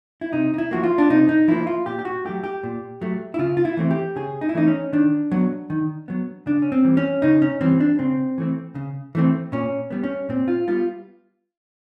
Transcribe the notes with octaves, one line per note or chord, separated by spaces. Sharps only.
E4
C3 D#4
D#4
E4
F3 A#3 F#4
F4
D4
C3 D#4
D#4
F3 A#3 E4
F4
A#2 G4
G4
F#4
F#3 A3 G4
G4
A#2
F#3 A3
E4
C#3 F4
F4
E4
E3 A3 C4
G4
C#3 G#4
D#4
E4
E3 A3 C4 D#4
C#4
D#3 D4
F#3 B3
D#3
F#3 B3
C#3 D4
C#4
C4
E3 G3
C#4
C#3 D#4
C#4
E3 G3 C4
D4
C#3 C4
E3 A3 C4
C#3
E3 A3 C4
A#2 C#4
G3 B3
C#4
A#2 C4
F4
G3 B3 F4